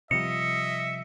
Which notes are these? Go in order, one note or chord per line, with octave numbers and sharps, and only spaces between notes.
C3 F3 G3 D#5 E5 C#7